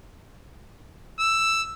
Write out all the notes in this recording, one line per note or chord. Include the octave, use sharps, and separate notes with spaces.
E6